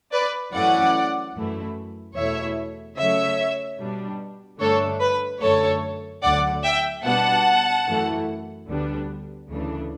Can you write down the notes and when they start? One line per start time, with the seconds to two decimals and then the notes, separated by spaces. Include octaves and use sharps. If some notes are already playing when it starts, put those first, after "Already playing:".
0.12 B4 D5
0.53 F#2 E3 A3 C#4 E4 D5 F#5
1.35 F#2 E3 A3 E4
2.16 E2 B2 A3 E4 C#5 E5
2.97 C#3 F#3 A3 C#5 E5
3.79 B2 G3 D4
4.60 G2 D3 A3 D4 A4 C#5
5.00 B4
5.41 F#2 D3 A3 A4 C#5
6.23 D2 D3 F#3 D5 F#5
6.63 E5 G5
7.04 B2 G3 B3 D4 F#5 A5
7.86 F#2 E3 A3 E4
8.67 D2 D3 G3 B3 D4
9.48 D2 C#3 E3 A3 D4